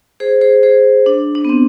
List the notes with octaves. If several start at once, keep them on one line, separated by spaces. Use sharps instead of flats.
G#4 C5
G#4 C5
G#4 C5
D4
D4
B3
C4